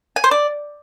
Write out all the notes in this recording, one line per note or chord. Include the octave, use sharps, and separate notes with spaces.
G#5
C5
D5